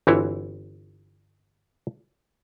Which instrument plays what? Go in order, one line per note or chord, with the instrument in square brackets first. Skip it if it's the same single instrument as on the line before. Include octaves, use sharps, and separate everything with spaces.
[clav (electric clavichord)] G1 E3 C4 E4 F#4 C#5